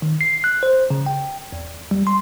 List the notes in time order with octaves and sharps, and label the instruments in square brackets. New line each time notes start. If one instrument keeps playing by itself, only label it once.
[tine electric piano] D#3
C7
F#6
C5
C#3
G5
E2
G3
C6